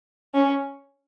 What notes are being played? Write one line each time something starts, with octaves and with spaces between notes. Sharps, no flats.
C#4